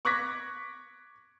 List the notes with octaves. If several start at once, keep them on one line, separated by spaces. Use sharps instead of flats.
C#6 D6 F#6 G#6 A#6 B6